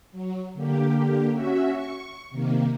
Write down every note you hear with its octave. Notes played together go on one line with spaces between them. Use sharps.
F#3
D3 A#3 G4
C#4 F#4 E5
C#6
C3 D#3 A#3